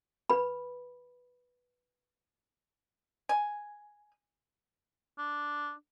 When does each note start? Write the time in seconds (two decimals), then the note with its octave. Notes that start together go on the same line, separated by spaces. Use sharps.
0.30 B4 B5
3.29 G#5
5.18 D4